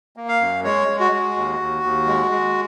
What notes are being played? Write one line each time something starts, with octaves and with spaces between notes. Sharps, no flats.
A#3
F5
F#2
G#3 C#5
G#3
F#4
G#3
D#2
D#2
D#2
G#3
G#3